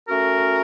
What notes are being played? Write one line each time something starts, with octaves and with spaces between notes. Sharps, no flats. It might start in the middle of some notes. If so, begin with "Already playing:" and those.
A3 C#4 F#4 A#4